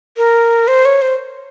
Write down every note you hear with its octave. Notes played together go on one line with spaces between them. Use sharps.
A#4
C5
C#5
C5